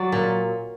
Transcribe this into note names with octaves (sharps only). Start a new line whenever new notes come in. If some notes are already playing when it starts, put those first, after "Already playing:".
Already playing: F#3 D5
A#2